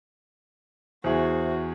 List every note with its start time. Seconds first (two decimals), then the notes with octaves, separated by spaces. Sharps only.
1.04 E2 F#4 G#4 C5 E5